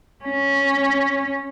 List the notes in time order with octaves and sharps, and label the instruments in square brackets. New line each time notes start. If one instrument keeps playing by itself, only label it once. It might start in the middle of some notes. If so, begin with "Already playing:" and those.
[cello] C#4